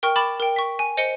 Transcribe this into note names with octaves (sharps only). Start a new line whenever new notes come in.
A#4 G5 C#6 F6
B5 D6 A6 E7 F#7
A#4 G5
C#6 B6
G#5
C5 D#5 C#7 D#7 G7